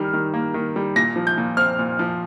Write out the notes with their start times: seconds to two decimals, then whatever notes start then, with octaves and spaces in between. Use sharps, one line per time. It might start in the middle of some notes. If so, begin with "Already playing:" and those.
Already playing: D#3 G3 F6
0.14 D#3
0.34 A#3
0.54 D#3
0.76 G3
0.96 A#2 A#6
1.16 F3
1.27 G6
1.38 A#2
1.57 C4 F6
1.79 A#2
1.99 F3